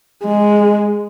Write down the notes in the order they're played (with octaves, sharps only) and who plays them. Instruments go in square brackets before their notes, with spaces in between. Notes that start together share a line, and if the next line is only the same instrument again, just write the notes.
[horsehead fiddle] G#3